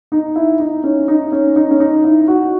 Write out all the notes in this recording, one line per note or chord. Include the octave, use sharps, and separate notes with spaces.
D#4
E4
D#4
C#4
D#4
C#4
D#4
C#4
D#4
E4
F#4